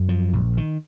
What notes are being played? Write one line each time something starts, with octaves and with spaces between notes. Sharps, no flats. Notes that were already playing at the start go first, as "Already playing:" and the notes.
Already playing: F#2
F3
A#1
D#3